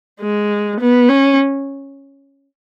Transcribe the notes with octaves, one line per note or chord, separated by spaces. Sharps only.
G#3
B3
C#4